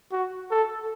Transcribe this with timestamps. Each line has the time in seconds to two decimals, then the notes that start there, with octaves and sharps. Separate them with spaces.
0.12 F#4
0.50 A4